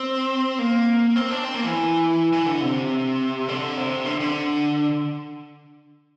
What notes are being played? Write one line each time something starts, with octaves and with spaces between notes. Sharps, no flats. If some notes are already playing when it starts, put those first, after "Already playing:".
Already playing: C4
A#3
C4
D4
C4
A#3
E3
E3
D3
C3
D3
C3
D3
D3